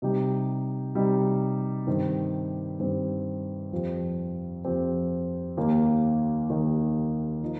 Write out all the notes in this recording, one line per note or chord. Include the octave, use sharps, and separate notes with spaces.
C3 G3 D#4 G4
C3 G3 D#4 G4
G2 D#3 C4 G4
G2 D#3 C4 G4
F2 F3 C4 G4
F2 F3 C4 G4
D#2 D#3 A#3 G4
D#2 D#3 A#3 G4
F3 D#4